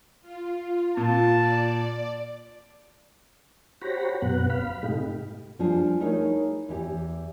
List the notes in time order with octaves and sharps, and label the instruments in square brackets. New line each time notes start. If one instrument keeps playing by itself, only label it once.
[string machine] F4
[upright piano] A#2 [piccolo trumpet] A5
[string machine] D5
[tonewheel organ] F#4 G4 C5 C#5 A#5 B5
F#2 B2 B3 F#5
F5 B5
G#2 C3 A3 D#4 G4
[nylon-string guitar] F3 G3 D4 G#4
A3 D#4 E4 G#4 A#4 C#5
E2 E3 G4